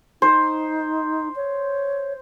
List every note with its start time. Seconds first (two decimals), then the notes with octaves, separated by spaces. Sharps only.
0.22 D#4 C5
1.36 C#5